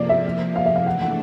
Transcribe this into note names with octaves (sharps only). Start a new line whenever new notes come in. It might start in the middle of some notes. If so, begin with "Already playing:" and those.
Already playing: C3 F3 A#3 D5
E5
F5
E5
F5
E3 A3 D4 F#5
F#5